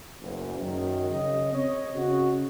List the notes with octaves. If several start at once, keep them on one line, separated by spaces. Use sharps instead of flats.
F#1 E2
F#2 D#3
C#3 D#5
C4 C#5 D#5
C#3 F#4